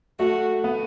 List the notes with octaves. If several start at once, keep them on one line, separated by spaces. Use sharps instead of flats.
A3 F#4
B3